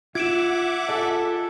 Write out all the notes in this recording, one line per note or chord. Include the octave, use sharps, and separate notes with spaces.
F4 E5 F#5 D6 G#6 D7 E7
F4 G#4 A4 D#5